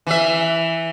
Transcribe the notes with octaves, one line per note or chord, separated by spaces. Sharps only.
E3 E5